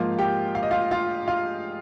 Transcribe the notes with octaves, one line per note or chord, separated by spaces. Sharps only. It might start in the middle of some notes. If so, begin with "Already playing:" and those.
Already playing: G#2 F3 A#3 F4 F5
G4 G5
F5
D#5
F4 F5
F4 F5
F4 F5